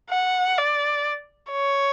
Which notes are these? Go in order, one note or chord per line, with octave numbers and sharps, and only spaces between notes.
F#5
D5
C#5